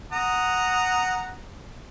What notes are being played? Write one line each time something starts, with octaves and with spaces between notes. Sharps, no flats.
F#5 A#5 D#6